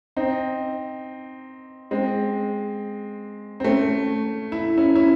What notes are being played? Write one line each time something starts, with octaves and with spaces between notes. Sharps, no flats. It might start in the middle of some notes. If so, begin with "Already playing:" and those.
C4 D#4
G#3 C4
C4
A3 C#4
E4
C#4 E4
C#4 E4